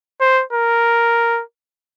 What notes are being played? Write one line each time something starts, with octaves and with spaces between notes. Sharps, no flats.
C5
A#4